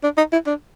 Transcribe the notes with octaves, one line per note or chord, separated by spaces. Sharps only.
D4
D#4
E4
D4